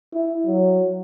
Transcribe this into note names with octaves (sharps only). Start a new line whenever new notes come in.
E4
F#3